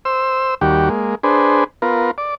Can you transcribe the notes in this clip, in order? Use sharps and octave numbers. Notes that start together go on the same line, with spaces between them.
C5 E6
D#2 G3 F#4 G4
G#3 A#3
D4 G#4 B4 C5
B3 F4 A#4
D5